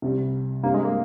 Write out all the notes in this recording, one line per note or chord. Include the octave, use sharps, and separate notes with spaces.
C2 C3 G3
G2 G3 A#3 C4
G#3
A#3